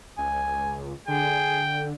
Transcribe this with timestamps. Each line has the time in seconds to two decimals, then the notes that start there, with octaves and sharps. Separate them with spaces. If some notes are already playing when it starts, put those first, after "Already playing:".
0.18 C#2 G#5
1.08 D3 G#4 G5